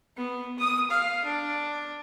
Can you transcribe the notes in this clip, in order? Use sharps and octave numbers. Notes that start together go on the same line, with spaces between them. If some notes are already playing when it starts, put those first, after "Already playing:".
B3
D#6
F5
D4